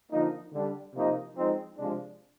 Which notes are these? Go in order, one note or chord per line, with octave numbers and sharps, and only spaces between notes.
D3 F3 A#3 D#4
D3 G3 D4
C3 F3 A#3 D#4
F3 G#3 C4 D#4
C3 F3 G#3 D4